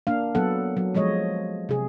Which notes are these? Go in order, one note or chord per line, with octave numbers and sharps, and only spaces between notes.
A#3 D4 F5
F#3 B3 A4 F#5
F#3
F3 G#3 C#5 D#5
C3 G#4